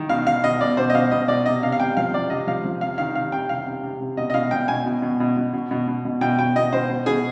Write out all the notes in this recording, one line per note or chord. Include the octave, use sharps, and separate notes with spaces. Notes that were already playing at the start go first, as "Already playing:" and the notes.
Already playing: D#3
B2 F5
B2 F5
B2 D#5
B2 D5
B2 C5
D#5
B2 F5
B2 D#5
B2 D5
C3 D#5
C3 F5
F5
C3 G5
F3 F5
C3 D5
C3 D#5
F3 F5
F3
C3 F5
D#3 F5
C3 F5
C3 G5
C3 F5
C3
C3
C3
B2 D#5
D#5
B2 F5
B2 G5
B2 G#5
B2
B2
B2
B2
B2
B2
B2
B2
B2 G5
B2 G5
B2 D#5
B2 C5
B2
B2 G#4